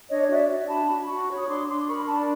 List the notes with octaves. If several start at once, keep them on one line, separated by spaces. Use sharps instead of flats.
D4 C#5 D#5
F#4 D5 E5
F#4
D4 A5 B5
F#4
F#4 B5 C#6
C#5
D#6
D4 C6 D6
D4 C6 D6
A#4 B5 C#6
D4 A5 B5